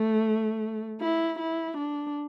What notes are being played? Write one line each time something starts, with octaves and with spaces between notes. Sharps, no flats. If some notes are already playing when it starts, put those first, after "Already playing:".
Already playing: A3
E4
E4
D4